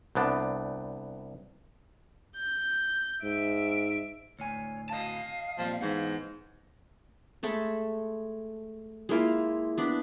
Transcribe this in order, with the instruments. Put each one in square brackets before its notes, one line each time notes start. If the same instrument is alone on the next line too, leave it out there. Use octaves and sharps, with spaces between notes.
[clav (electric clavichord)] C2 B3 D4
[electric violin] G6
[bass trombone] G#2 [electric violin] E5 D7
[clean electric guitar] D2 A2 G#5 [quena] C#5
[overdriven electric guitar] D#5 A5 [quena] F5
[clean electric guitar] A#2 G3 C4 [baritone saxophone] F3
[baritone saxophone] G#2 [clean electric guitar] E3 B3
[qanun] G#3 A3 A4 B5
G#3 A#3 E4 F4
B3 D4 B5